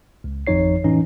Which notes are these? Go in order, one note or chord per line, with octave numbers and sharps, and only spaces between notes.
C#2
G#1 F2 F3 D#4 C#5 C7
A2 E3 C#4 D#4